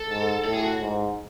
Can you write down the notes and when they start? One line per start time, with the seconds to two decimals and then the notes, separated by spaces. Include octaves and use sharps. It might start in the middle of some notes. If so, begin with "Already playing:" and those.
Already playing: A4
0.09 G#2
0.45 A2 A4
0.54 G#4
0.63 F#4
0.82 G#2